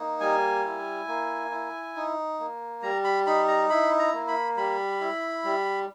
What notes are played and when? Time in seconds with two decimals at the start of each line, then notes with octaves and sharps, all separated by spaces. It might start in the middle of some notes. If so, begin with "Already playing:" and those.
Already playing: A#3 D#4
0.20 G3 G#5
0.64 E4
1.08 A#3
1.51 E4
1.96 D#4
2.39 A#3
2.82 G3 A#5
3.04 B5
3.27 D#4 B5
3.48 A#5
3.70 E4 B5
3.99 A#5
4.14 A#3
4.28 B5
4.56 G3 B5
5.01 E4
5.44 G3